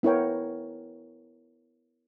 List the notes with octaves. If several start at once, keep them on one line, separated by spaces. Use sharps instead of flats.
B3 E4 A#4 C#5 G5